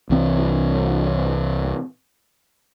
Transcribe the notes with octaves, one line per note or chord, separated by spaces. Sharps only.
C2 E3 C4